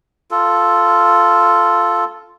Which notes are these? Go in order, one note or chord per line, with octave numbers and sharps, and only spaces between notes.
F4 A4